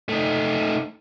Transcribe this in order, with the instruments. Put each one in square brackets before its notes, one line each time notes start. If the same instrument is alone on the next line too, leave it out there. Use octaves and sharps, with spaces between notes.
[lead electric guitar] A3 D#4